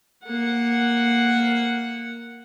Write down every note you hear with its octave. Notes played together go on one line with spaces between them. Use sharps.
A#3 F#5